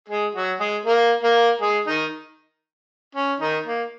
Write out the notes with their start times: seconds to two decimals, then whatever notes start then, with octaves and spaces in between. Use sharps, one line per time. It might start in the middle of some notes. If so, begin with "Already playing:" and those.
0.08 G#3 G#4
0.35 F#3 F#4
0.59 G#3 G#4
0.85 A#3 A#4
1.23 A#3 A#4
1.61 G#3 G#4
1.87 D#3 D#4
3.15 C#4
3.39 D#3 D#4
3.66 A#3